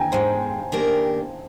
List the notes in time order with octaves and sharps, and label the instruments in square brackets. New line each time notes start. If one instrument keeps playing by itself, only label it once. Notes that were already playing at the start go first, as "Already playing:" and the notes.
Already playing: [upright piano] G5 G#5 A#5
[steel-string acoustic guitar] G#2 D#3 G#3 [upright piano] C5
[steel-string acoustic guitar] D#3 A#3 D4 G4 A#4